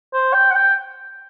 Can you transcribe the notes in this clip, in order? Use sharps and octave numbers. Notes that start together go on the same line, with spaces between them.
C5
G5
F#5
G5